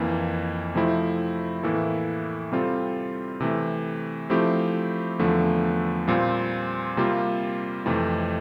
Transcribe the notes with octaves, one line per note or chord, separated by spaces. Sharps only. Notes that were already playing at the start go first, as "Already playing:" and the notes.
Already playing: F2 E3 A#3
C3 F3 A3 C4 E4
A2 E3 A#3 E4 A4
C3 G3 C4 F4 A4
C3 E3 A3
F3 A3 C4 E4 G4
E2 D3 F3 A3
A#2 G3 C4 F4
C3 G3 A#3 F4
F2 C3 E3 A3